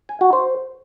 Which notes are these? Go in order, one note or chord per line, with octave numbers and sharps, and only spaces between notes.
G#5
F#4
C5